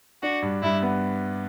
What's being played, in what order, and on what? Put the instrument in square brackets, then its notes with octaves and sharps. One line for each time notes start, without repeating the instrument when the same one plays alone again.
[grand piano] D4 [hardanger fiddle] F#4
[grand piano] G2
[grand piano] G2 [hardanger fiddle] E4
[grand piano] B3